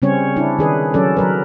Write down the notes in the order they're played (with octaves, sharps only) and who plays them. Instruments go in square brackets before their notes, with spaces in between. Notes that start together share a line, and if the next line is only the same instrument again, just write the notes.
[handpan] C#3 G3 C4 C#4 C#5
D4 E4
D#3 G#4 B4
F#3 C#4 A4 D5
F#3 A#4 B4